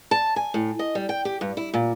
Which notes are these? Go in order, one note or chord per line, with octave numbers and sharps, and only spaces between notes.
A5
G#5
A2
D#5
G3
G5
G4
G2
E4
A#2